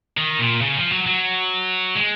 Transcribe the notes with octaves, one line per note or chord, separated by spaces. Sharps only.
D#3
A#2
C#3
F3
F#3
F#3
G#3